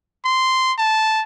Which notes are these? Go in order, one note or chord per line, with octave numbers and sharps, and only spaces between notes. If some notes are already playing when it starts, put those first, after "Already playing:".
C6
A5